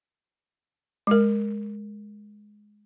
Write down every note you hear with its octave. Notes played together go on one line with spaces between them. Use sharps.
G#3 A#4